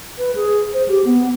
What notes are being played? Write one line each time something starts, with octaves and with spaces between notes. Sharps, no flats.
B4
G#4
C5
G4
B3